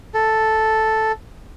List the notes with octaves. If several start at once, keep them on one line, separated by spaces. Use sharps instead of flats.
A4